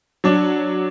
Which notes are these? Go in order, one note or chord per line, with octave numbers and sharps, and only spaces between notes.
F#3 D4